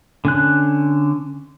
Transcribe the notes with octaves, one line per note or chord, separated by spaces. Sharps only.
D3 C#4 F#6